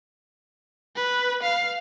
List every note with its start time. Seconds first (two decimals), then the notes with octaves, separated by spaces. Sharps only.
0.96 B4
1.42 F5